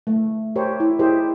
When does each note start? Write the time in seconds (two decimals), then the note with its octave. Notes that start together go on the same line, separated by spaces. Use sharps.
0.07 A3
0.56 G4 A#4 C5 C#5 E5
0.80 E4
0.99 E4 G4 G#4 A#4 C5 D#5